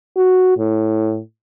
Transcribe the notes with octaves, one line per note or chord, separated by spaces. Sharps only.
F#4
A2